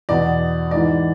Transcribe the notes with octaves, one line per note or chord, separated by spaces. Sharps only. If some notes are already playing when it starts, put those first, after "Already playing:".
E2 B2 D5
G#2 E3 D5